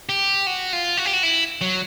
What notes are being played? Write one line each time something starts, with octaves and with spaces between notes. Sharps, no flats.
G4
F#4
F4
F#4
G4
F#4
E4
F#3